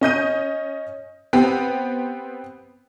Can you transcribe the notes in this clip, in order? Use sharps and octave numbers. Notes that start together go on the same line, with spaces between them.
C#4 D#5 G6 D#7
B3 C4 G4